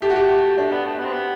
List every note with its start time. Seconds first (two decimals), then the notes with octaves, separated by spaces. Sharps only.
0.02 A3 G4
0.10 F#4
0.16 G4
0.30 F#4
0.57 A3 D4
0.71 B3
0.85 A3
0.98 B3
1.05 C4
1.12 B3